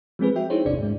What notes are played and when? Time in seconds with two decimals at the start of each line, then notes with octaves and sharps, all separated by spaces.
0.19 F3 G#3 C4 G#4 B4
0.36 F#4 E5 G5
0.50 D#4 E4 G#4 C5 C#5
0.65 G#1 E2 C3 D4 D5
0.78 G#2 G#3